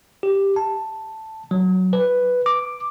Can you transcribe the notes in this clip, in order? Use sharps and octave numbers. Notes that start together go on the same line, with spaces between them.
G4
A5
F#3
B4
D6